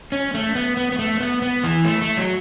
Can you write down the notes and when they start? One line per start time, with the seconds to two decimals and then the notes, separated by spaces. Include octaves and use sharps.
0.12 C#4
0.34 A3
0.55 B3
0.77 B3
0.92 B3
0.99 A3
1.20 B3
1.42 B3
1.64 E3
1.85 A3
2.01 A3
2.17 F#3